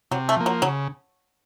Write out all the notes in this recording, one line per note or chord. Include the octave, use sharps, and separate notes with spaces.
C3 F#3
A3
F3 A#3
F#3
C#3 F#3